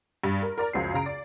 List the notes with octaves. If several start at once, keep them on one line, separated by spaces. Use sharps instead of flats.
G2
A#4
A#4 D5 A#5
C#2 F#2 F3 C7
C#3 F5 A#5 D7
D5